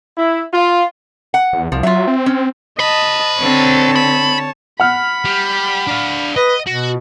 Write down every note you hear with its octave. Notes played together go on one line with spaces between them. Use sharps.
E4
F4
F#5
E2
C2 F3
F#3 F4 E5
C4
C#4
C5 D#5 A5 B5
D3 C4 C#5 A5
B5
F#5 B5 F6
G3
D4 F5
B4 D#5
B2 F#4